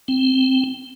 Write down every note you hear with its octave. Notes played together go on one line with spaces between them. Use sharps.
C4